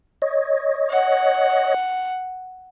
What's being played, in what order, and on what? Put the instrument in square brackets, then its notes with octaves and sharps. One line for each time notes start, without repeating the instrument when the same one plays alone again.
[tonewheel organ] C#5 D#5
[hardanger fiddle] F#5